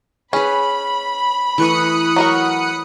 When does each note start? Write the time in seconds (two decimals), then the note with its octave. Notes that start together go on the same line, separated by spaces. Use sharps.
0.33 C#4 G#4 B4 B5
1.58 E3 A3 C#6 D#6 F#6 C#7
2.16 F#3 F#4 A#4